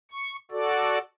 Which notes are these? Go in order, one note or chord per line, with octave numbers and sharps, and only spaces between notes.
C#6
F#4 A4 D5